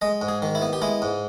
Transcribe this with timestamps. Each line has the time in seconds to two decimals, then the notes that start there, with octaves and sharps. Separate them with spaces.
0.02 G#3 D#5
0.21 G#2
0.28 G#4
0.42 D#3
0.55 E4
0.62 B3
0.73 G4
0.82 G#3 E4
1.02 G#2